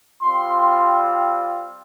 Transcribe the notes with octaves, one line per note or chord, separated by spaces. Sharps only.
G3 C4 F4 C6
C6